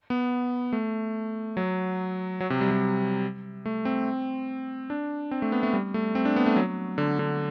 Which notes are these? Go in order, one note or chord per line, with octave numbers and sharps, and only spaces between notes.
B3
A3
F#3
F#3
C3
G3
G3
A3
C4
D4
C4
A3
B3
A3
G3
A3
C4
D4
B3
A3
F#3
D3
D3